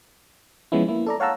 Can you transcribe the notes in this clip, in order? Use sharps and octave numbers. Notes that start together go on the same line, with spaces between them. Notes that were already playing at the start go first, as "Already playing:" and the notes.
F3 G#3 B3 C#4 E4
A#3 E4
A4 D5 A#5
C#5 F5 F#5 A5 A#5 E6